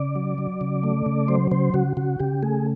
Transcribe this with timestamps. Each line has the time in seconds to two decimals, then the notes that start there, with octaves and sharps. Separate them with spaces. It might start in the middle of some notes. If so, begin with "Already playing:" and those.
Already playing: C#3 D5
0.16 F#3
0.38 F#3
0.61 C#3
0.83 A3
1.06 C#3
1.28 F#3 C5
1.52 C#3 C5
1.74 C#3 F#4
1.97 C#3 F#4
2.20 C#3 G4
2.43 A3 G#4